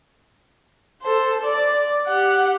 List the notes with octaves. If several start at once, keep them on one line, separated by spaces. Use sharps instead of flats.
A4 C5
D5
G4 F#5